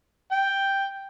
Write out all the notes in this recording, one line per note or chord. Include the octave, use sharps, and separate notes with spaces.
G5